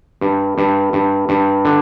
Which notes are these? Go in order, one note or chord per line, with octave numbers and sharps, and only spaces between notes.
G2
G2
G2
G2
D3